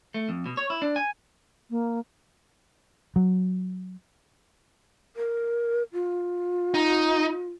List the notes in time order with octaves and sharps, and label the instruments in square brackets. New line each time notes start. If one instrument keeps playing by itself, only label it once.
[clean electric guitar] A3
F2
B2
C#5
E4
D4
G#5
[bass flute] A#3
[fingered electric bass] F#3
[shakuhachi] A#4
F4
[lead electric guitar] D#4